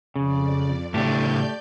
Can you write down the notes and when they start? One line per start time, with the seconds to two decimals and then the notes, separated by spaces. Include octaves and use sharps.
0.16 F2 C#3 D5
0.94 A2 C#3 A3 D4 G4 D5 G6